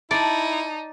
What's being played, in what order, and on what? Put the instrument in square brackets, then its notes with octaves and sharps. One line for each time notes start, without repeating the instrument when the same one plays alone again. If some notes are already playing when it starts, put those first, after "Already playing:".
[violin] D#4 [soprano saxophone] E4 [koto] D5 [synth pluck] A5